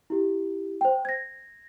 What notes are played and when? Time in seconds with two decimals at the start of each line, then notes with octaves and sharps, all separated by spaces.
0.10 E4 G4
0.81 C5 G5
1.05 G#6 A#6